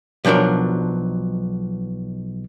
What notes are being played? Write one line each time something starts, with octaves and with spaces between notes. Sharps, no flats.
B1 F3 F#3 D4 A#4